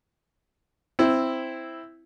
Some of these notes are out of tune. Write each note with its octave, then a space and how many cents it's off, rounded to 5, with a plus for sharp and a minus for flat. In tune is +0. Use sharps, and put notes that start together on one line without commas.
C4 +0 E4 +0